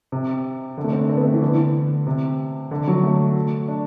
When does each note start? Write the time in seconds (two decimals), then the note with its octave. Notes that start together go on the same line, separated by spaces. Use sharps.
0.12 C3
0.77 D3
0.84 A3
0.92 C4
1.01 D4
1.09 C4
1.17 B3
1.25 A3
1.34 E3
1.42 D3
2.07 C3
2.71 D3
2.88 F#3
3.03 A3
3.68 D4